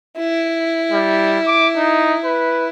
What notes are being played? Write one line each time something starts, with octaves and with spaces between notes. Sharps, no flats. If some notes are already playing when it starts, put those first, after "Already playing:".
E4
G3
D6
D#4
B4